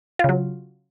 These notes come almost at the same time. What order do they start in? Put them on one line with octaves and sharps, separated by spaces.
F4 C#3 F#3